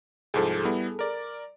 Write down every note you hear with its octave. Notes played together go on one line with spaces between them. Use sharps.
C2 G#2 F3 G#4 A4
G3 B3 E4
A#4 D5